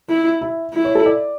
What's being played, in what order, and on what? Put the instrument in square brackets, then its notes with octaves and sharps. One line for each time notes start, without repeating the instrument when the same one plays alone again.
[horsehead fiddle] E4
[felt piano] E4
[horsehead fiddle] E4
[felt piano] C#5
A4
D5